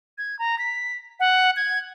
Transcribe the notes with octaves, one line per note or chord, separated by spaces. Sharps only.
G#6
A#5
B6
F#5
G#6